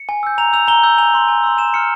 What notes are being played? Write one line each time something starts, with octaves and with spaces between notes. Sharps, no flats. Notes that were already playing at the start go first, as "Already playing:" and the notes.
Already playing: C#7
G#5
E6 G6
A#5 F7
E6 G6 F7
A#5 G7
E6 G6
G#5 F7
C6 E6
G#5
C6 E6
G#5 E7
C6 F6 C#7